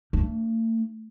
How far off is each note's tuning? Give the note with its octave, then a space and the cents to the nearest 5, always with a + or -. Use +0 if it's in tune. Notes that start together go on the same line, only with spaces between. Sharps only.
A3 +45 D4 +0